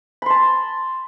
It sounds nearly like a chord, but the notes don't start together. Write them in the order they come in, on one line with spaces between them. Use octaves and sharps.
B5 C6 A5